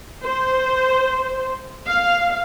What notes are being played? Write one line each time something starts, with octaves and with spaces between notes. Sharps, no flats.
C5
F5